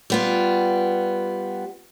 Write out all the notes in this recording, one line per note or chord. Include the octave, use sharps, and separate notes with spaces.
G3 B3 F4